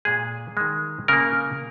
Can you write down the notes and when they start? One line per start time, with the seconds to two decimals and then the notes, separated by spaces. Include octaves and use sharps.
0.05 A#2 G#3 G#4
0.57 D#3 G#3
1.08 C#3 A#3 A#4